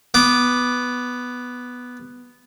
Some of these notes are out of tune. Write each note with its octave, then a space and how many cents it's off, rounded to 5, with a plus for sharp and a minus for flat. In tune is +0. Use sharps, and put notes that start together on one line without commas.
B3 +0 D6 +0